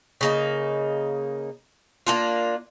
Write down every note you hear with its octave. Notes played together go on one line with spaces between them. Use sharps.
C#3 A#3 D#4
A#3 D4 F4